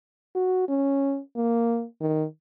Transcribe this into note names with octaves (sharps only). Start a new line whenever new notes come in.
F#4
C#4
A#3
D#3